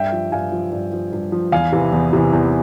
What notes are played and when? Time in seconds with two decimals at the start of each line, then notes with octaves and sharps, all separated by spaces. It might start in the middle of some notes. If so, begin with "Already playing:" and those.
Already playing: G2 E5 G5
0.12 F3
0.32 G2 F5 G#5
0.52 F3
0.72 G2
0.93 F3
1.12 G2
1.32 F3
1.52 E2 F5 G#5
1.72 C3 E3
1.93 E2
2.13 C3 E3
2.33 E2